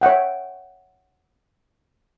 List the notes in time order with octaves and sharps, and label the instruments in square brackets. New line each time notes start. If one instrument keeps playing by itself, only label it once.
[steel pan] C#5 E5 F#5 G5